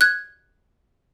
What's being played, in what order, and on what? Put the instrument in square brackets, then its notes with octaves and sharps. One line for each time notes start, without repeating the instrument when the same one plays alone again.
[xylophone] F#6 G#6